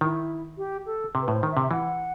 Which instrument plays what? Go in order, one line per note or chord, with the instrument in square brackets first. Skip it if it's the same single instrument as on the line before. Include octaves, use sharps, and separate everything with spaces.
[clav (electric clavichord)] D#3 [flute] E4
[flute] G4
A4
[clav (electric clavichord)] C3
[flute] B4
[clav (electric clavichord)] A2
[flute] C5
[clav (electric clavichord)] D#3
[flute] E5
[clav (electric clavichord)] C3
[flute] E5
[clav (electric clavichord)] E3 [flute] F#5